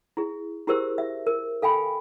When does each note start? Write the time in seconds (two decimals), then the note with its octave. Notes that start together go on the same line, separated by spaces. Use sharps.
0.17 E4 G#4
0.67 E4 G4 G#4 A#4 C5 E6
0.98 E5
1.27 A#4
1.62 A4 F5 G5 G#5 B5